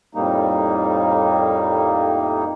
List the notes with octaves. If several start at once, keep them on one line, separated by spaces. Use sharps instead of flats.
F2 A2 G3 A#3 D#4